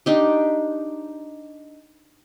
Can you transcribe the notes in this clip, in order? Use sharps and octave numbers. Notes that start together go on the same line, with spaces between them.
D4 D#4 G4